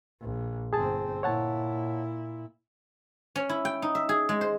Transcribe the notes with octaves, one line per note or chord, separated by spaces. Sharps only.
A#1
G1 C4 G#4 A5
A#2 E4 C#5 F#5 A5
C#4
E4
G5
D#4
E5
G#4
G#3
C5